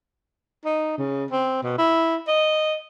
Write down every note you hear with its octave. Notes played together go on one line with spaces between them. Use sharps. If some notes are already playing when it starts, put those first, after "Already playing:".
D#4
C#3
C4
B2
E4
D#5